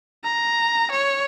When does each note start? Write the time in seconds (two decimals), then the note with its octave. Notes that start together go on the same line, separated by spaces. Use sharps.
0.24 A#5
0.91 C#5